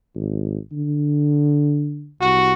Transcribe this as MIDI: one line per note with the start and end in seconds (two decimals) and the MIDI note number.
0.15 0.58 32
0.72 2.13 50
2.21 2.53 36
2.21 2.53 66